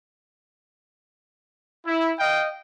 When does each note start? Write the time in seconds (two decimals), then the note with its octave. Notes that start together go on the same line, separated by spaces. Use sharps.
1.87 E4
2.20 D#5 F5 G5